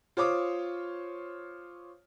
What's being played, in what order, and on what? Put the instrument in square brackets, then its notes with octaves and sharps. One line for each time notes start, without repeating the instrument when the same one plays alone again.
[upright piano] F4 C5 C#5 D6 D#6